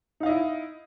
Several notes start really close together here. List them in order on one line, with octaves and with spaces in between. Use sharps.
D#4 F5 D#5 E4